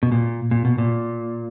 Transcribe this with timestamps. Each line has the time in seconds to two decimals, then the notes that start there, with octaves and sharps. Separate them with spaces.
0.03 B2
0.12 A#2
0.51 A#2
0.65 B2
0.78 A#2